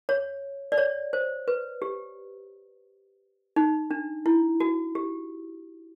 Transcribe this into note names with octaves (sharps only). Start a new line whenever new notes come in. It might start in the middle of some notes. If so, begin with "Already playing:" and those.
C#5
D5
C#5
C5
B4
G4
D#4
D4
E4
F#4
G4